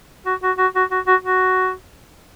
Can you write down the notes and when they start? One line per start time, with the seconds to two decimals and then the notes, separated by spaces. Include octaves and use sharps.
0.26 F#4
0.43 F#4
0.58 F#4
0.75 F#4
0.91 F#4
1.07 F#4
1.24 F#4